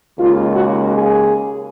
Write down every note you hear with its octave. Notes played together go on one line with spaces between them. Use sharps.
D#2 C#3 G#3 F4
F#4
G#4